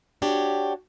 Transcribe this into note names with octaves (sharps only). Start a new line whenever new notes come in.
D4 F#4 G4 C#5